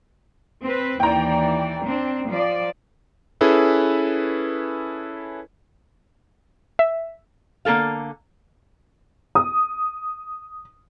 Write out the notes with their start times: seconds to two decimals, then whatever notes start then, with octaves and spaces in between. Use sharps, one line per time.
0.62 C4 B4
1.00 D#2 E3 D5 G5 A#5
1.83 C4 D4
2.28 F3 D5
3.41 C#4 E4 G#4 A4 B4
6.79 E5
7.65 D3 A#3 F#4 A4 F5
9.35 D#6